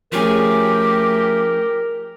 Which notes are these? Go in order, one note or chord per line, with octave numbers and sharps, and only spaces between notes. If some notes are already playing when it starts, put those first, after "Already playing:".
F3 A3 C#4 G4 G#4 A#4